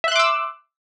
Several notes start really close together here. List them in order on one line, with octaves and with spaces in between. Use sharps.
E5 F#6 C6 D6 E6